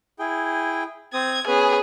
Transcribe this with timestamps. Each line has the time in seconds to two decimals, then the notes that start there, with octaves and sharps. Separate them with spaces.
0.19 E4 G#4 G5
1.14 C4 D#6 G#6
1.47 B3 C#4 G#4 B4